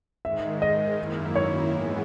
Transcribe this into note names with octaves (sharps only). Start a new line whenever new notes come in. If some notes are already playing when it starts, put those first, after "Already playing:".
G#2 D#3 G#3 E5
D#5
F#2 D#3 A#3 E4
C#5
G#2 E3 G#3 B3